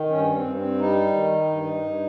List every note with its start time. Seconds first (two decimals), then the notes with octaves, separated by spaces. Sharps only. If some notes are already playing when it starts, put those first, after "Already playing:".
Already playing: D#3
0.10 G2 C#4
0.33 C4
0.45 G2
0.56 C4
0.79 G3 D#4
1.14 D#3
1.49 G2
1.83 G2